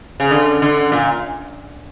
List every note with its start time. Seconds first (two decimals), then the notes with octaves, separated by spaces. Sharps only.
0.20 C#3
0.31 D3
0.62 D3
0.92 A#2